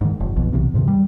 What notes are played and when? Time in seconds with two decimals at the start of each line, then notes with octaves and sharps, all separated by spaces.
0.01 G#2 D#3
0.20 F1
0.36 B1 F2 B2
0.53 B1 E2 C3
0.74 E2 G#2 C3 D#3
0.88 G3